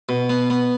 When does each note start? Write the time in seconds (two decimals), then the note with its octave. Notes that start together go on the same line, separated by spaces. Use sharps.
0.09 B2
0.30 B3
0.50 B3